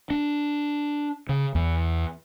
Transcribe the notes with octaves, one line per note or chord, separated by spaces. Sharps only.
D4
C#3
E2